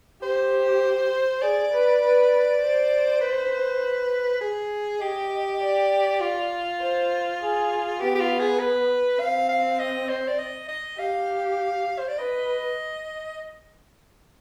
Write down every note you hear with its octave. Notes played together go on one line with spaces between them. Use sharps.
G4 C5
G#4 D5
B4
B4
C5
B4
G#4
G4 D#5
D5
F4
C5
G#4
B3 G4
G4
F4
G#4
B4
C4 F5
F5
D#5
C5
D5
D#5
D#5
G4 F5
C5
D5
B4 D#5